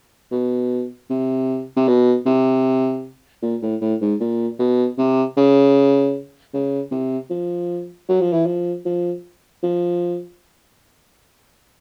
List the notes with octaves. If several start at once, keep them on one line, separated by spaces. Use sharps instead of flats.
B2
C3
C3
B2
C3
A#2
A2
A2
G#2
A#2
B2
C3
C#3
C#3
C3
F3
F#3
F3
E3
F3
F3
F3